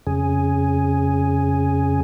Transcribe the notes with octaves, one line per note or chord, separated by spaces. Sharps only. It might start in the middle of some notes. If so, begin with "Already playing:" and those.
F2 C#3 G#4